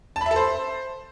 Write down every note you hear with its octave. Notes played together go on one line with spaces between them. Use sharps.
A5
B5
E5
A4
C5